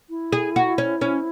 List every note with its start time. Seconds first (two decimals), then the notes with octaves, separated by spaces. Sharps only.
0.10 E4
0.33 G#4
0.56 F#4
0.78 C#4
1.01 C#4